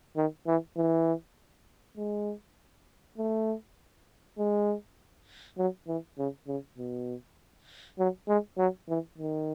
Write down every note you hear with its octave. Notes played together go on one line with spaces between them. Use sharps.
D#3
E3
E3
G#3
A3
G#3
F#3
E3
C#3
C#3
B2
F#3
G#3
F#3
E3
D#3